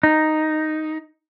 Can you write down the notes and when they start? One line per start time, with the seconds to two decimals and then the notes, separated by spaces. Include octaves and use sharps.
0.03 D#4